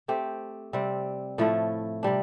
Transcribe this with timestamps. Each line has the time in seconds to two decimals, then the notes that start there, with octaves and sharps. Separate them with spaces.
0.08 A3 C4 G4
0.73 C3 G3 C4
1.38 A2 F3 A3 E4
2.03 C3 G3 D4